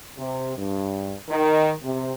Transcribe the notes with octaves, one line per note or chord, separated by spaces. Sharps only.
C3
G2
D#3
C3